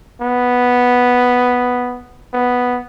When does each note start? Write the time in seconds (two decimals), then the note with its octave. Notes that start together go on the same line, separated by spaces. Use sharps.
0.21 B3
2.33 B3